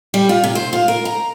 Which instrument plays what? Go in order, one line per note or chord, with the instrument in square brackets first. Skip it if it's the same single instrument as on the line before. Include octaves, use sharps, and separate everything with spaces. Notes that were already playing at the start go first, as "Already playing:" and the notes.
[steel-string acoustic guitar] G3
F4
C3
C5
F4
A#4
A#5